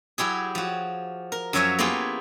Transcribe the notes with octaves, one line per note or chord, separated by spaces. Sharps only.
F#3 E4 G4 G#4
F3 F#4
A#4
F#2 F3 F#3 C#5 E5 G#5
A#3 B3 E4 F4 G4 G#4